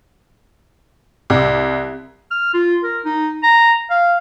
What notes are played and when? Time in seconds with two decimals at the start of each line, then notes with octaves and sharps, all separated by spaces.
1.30 C2
2.31 F6
2.54 F4
2.83 A#4
3.05 D#4
3.43 A#5
3.90 F5